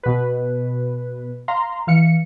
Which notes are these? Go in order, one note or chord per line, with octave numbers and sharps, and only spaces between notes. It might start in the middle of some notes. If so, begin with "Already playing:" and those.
B2 B4
F5 A#5 C6
E3 F5 C#7